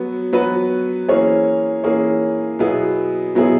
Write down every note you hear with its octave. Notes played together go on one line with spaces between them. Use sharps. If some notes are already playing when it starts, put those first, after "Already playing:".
Already playing: F#3 B3 F#4
F#3 B3 F#4 B4
E3 A#3 C#4 G#4 C#5
E3 A#3 C#4 G#4 C#5
B2 F#3 B3 E4 G#4
B2 F#3 B3 E4 G#4